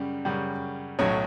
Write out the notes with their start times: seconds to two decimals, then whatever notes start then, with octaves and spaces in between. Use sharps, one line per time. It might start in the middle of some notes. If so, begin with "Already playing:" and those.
Already playing: F#2 C#3 G3
0.25 F#2 C#3 G3
0.99 B1 A2 F#3 C#5